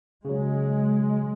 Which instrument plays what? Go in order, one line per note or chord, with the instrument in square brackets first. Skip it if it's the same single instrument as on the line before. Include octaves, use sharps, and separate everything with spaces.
[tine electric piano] C#3 F#3 [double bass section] G#3